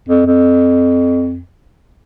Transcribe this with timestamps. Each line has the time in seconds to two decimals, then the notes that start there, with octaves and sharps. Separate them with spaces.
0.09 F2
0.26 F2